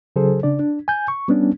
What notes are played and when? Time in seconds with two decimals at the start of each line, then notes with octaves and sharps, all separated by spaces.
0.16 C#3 F#3 G#4 A4 C5
0.43 C#3 D4 D5
0.59 D4
0.88 G#5 G6
1.08 C#6
1.28 G3 B3 C#4 D4